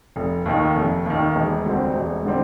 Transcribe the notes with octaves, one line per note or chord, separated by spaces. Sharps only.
F1
D#2 D#3
F1
D#2 D#3
E1
D2 D3 G3 C4
E1
D3 G3 C4